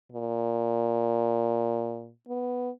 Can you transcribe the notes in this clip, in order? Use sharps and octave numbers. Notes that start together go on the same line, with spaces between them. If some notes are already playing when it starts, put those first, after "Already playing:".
A#2
B3